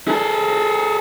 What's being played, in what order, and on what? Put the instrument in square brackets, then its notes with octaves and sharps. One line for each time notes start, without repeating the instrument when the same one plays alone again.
[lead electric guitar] G#4 A4